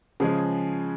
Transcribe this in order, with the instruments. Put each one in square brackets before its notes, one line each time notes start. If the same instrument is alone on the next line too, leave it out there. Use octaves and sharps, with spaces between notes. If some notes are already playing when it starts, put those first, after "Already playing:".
[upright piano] C#3 F3 G#3 G#4